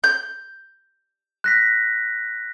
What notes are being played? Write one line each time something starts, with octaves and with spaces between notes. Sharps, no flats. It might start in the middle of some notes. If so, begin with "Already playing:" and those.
G6
F#6 A#6 B6